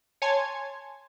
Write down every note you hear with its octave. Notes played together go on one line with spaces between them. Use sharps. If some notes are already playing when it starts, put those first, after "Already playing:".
C#5 G#5 A5 C6 G#6